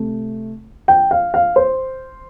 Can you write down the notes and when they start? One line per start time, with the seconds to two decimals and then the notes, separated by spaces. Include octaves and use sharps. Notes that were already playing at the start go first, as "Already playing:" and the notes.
Already playing: C3 A3
0.88 G5
1.11 F5
1.34 F5
1.56 C5